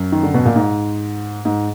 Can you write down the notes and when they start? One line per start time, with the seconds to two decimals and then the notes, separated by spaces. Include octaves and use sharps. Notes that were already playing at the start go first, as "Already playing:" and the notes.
Already playing: F#2
0.12 D#3
0.23 D3
0.34 B2
0.45 A#2
0.56 G#2
1.45 G#2